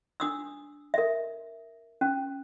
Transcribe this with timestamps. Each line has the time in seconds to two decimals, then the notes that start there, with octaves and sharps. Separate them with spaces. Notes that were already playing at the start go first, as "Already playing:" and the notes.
0.20 D4 D#6 E6
0.94 A#4 E5
2.01 C#4